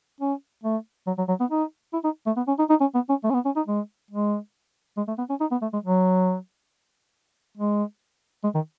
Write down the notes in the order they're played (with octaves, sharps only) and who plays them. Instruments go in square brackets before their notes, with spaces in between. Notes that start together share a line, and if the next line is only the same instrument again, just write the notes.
[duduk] C#4
A3
F#3
F#3
F#3
B3
D#4
E4
D#4
A3
B3
C#4
D#4
D#4
C#4
B3
C#4
A3
C#4
B3
C#4
D#4
G#3
G#3
G#3
A3
B3
C#4
D#4
B3
A3
G#3
F#3
G#3
G#3
D#3